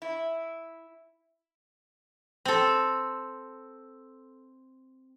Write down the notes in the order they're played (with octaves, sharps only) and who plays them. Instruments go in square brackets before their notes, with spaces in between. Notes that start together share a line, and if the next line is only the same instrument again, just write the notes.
[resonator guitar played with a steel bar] E4
[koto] C4 A4